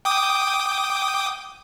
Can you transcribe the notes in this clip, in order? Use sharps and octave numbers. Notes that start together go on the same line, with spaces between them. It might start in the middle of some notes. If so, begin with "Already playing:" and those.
G5 D6 D#6